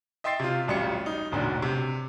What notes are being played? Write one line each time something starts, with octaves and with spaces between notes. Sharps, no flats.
D#5 E5 G5 C6 A6 C7
C3 F4
D1 A1 G3 F4 C#7
D#4
E1 A1 A#2 D3
C3